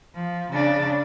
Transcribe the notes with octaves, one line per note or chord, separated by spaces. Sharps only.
F3
C#3 D4